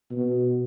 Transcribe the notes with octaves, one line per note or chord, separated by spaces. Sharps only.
B2